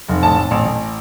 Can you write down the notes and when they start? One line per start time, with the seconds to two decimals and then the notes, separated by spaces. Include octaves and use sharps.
0.09 F1
0.23 A1 A5
0.37 A1
0.51 A1
0.65 A1